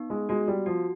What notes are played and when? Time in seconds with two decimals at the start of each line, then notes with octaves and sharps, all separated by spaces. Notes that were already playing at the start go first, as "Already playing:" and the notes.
Already playing: B3 D#4
0.10 G#3
0.29 G#3 F#4
0.48 G3
0.66 F3 F#4